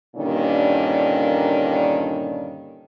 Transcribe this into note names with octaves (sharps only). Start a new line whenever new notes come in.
G2 A#2 D3 D#3 A#3 C#4